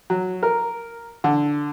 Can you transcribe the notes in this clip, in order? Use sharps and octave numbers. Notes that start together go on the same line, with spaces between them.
F#3
A#4
D3